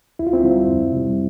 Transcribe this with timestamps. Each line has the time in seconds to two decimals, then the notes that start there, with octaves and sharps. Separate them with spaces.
0.19 D2 E4
0.27 F4
0.33 C4 E4
0.44 D3 G3
0.68 F2
0.92 C3 G3